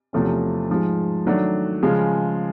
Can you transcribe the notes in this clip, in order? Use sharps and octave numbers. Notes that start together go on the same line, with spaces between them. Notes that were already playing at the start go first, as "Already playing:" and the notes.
E2 C3 F3 A3 C#4
G#2 F3 G#3
D#3 F#3 A3 D4
C#3 F3 G#3